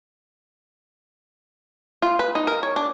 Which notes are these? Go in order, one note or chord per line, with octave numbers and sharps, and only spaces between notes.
F4
B4
D#4
A#4
C#5
D4